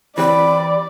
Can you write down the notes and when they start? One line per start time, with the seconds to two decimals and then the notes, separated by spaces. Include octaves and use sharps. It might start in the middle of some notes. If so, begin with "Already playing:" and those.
0.18 E3 C4 G4 D5 B5